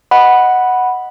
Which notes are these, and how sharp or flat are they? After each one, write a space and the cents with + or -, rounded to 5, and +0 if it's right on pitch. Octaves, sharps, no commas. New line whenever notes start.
D#5 +0 F#5 +0 B5 -10